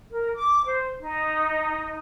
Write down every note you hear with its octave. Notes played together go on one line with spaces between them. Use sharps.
A#4
D6
C5
D#4